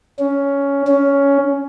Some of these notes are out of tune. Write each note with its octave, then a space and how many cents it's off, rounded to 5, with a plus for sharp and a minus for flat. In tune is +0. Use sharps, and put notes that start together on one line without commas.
C#4 +10
C#4 +10